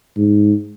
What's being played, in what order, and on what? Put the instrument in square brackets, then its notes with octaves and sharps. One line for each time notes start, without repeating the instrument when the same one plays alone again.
[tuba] G#2